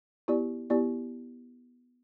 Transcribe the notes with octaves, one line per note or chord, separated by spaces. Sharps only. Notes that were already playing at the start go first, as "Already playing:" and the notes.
B3 E4 G4 D5
B3 E4 G4 D5